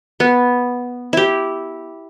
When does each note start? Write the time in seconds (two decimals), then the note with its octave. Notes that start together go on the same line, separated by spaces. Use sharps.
0.20 B3
1.13 E4 G4